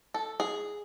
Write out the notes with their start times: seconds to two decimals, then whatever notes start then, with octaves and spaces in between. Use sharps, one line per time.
0.14 A4
0.40 G#4